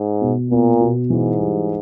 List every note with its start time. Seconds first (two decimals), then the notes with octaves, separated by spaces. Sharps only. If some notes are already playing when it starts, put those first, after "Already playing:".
Already playing: G#2
0.21 B2
0.51 A#2 B3
0.81 B2
1.10 G#2 E3
1.40 G3